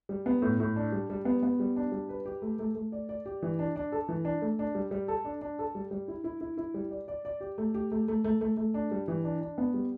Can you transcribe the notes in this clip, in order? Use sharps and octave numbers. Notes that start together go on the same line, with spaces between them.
G3
B3
A2
A2
D4
G3
G3
B3
B3
G3
D4
G3
B4
G4
A3
A3
A3
D5
D5
G4
E3
D4
D4
A4
E3
D4
A3
D4
G3
G3
A4
D4
D4
A4
G3
G3
E4
E4
E4
E4
G3
D5
D5
D5
G4
A3
G4
A3
A3
A3
A3
A3
D4
G3
E3
D4
D4
B3
G3